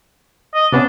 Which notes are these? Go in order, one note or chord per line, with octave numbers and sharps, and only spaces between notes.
D#5
C3 B3 C#4 D4